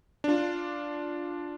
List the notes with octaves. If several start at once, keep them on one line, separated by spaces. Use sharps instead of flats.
D4 F4